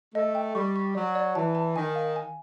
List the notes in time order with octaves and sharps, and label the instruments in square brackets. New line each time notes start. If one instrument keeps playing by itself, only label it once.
[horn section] A3 [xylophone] D#5
[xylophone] G5
[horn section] G3 [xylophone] C#6
[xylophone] C#6
[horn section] F#3 [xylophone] D5
[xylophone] D5
[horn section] E3 [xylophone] A5
[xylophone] A5
[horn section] D#3 [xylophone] G#5
[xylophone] F5
G#5